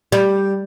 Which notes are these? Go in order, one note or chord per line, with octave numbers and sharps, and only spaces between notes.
G3